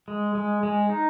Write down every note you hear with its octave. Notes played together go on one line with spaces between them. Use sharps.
G#3
G#3
G#3
D#4